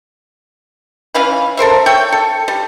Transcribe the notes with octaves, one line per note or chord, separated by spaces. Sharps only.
E3 C#4 F5 B5
A4 A#4 C5 E5
C#5 E5 G5
A4
G3